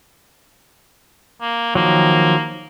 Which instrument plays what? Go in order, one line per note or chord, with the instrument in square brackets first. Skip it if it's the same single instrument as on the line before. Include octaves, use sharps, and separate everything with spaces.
[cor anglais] A#3
[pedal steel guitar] D#3 F3 F#3 [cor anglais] A#3